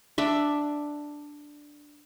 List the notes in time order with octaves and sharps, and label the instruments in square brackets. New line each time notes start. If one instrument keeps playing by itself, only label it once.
[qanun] D4 D5 E5